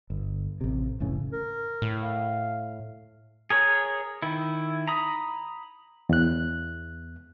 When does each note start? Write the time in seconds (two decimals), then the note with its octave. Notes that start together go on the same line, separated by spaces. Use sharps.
0.10 G1
0.61 A1 C3
1.00 F1 A2 C#3 E3
1.33 A#4
1.82 A2
2.03 F5
3.50 G#4 A#4 C#5
4.22 D#3 E4
4.88 A#5 B5 D#6
6.09 E2 F#6